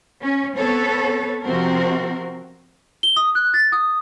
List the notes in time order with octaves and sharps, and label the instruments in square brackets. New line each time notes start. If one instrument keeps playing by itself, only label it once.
[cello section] C#4
B3 C4 A4 B4 C#5
C3 F3 C4 F#4 A#4
[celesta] G7
D#6
F#6
A6
D#6